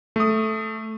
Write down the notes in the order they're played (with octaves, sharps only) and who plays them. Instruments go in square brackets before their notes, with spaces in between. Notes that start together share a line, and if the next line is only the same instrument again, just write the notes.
[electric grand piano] A3 D#6